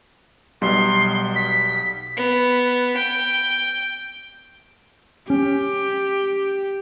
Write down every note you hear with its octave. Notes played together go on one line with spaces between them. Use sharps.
B1 B2 G3 C6
B6
B3
G5
C#4 G4